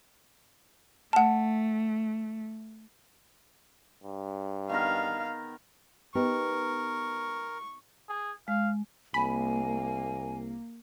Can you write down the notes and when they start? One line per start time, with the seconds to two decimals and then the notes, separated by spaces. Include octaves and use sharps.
1.13 A3 F#5 A5
4.04 G2
4.70 D#3 B3 A#4 F5
6.15 B3 D#4 G4 A#4 C#6
8.09 G#4
8.48 G#3 F5
9.14 C2 A#3 G#5 B5